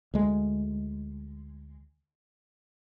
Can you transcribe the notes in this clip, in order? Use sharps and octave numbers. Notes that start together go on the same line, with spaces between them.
D2 G#3